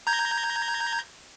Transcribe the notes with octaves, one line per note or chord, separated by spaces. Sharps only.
A#5 G6 G#6